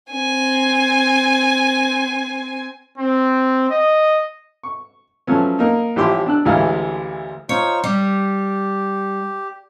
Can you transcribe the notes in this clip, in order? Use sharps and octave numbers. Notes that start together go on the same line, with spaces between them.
C4 G#5
C4
D#5
C#6
F3 F#3 A3 B3 C#4
A#3 D#4
A1 F3 E4 G4 G5 C6
D4 E6 F#6
A1 D2 E3 G#3 E4 F5
D#4 F4 C5 C#5
G3 G4